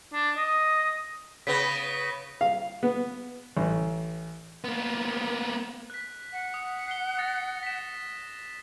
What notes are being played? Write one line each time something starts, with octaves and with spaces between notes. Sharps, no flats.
D4
D#5
C#3 B3 A#6 B6
F5
B3
A1
A#3 B3
F#6 B6
F#5
D#6
C7 G7
D#6 A6 A#6
B6 E7